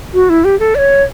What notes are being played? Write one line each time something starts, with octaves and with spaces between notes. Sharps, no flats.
F#4
E4
G4
A4
D5
C#5